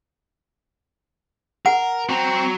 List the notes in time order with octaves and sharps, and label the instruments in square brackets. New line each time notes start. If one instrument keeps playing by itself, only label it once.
[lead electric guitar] A#4 [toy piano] F#5
[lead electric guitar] C4 [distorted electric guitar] F#4 A#5